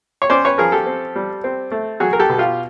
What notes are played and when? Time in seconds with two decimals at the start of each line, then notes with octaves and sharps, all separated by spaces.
0.22 C#5
0.30 C#4 C5 D5
0.45 B4 C#5
0.58 F3 G#4 A#4
0.72 G4 A4
0.87 C4
1.16 G3
1.44 C4
1.72 A3
2.00 F#3 F#4 G#4
2.13 A#4
2.19 G4 A4
2.30 B2
2.38 F4 G4